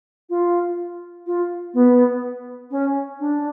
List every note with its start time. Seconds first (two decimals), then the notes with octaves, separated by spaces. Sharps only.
0.30 F4
1.26 F4
1.74 B3
2.71 C#4
3.20 D4